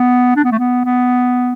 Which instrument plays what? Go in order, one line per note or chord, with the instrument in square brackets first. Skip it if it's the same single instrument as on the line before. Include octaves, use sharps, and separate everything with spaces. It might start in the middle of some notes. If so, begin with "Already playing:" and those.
Already playing: [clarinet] B3
D4
B3
A3
B3
B3